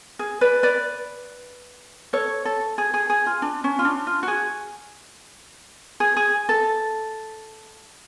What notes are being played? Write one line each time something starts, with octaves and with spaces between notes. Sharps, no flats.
G#4
B4 D5
B4 D5
A4 C#5
A4
G#4
G#4
G#4
F4
D4
C#4
F4
D4
F4
F#4
G#4
G#4
G#4
A4